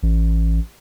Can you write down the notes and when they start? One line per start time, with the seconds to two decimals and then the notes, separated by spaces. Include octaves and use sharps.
0.03 A1